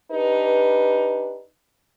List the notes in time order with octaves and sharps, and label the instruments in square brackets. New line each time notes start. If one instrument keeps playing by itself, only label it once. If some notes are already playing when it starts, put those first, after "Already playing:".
[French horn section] D4 D#4 G4 B4